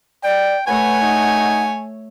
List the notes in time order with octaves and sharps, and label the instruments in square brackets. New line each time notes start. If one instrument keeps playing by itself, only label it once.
[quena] D5 [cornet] G5
[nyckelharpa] A3 C#5 [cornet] B4 [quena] F#5 [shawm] G#5
[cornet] D#4